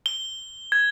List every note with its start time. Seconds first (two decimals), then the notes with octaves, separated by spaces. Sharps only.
0.06 G7
0.72 G#6